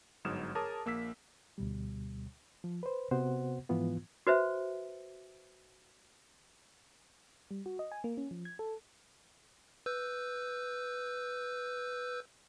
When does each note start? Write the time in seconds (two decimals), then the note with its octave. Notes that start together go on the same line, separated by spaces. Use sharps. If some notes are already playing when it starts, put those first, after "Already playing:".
0.25 G1 G#2 F#3 D#6 F6 E7
0.55 G#4 A#4 C#5 A5 D6 D#6
0.85 A#1 A#3 E6 B6
1.58 D2 B2 G3
2.64 F3
2.83 B4 C5
3.11 C3 B3 F#4 C5 F#5
3.69 G#2 E3 F3 B3 F4
4.27 F#4 B4 C5 E5
7.51 G3
7.66 F#4
7.79 D#5
7.92 G#5
8.04 A#3
8.17 C#4
8.31 F3
8.45 G#6
8.59 A4
9.86 B4 E6 G6